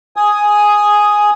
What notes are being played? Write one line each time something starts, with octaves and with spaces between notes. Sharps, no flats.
G#5 D#6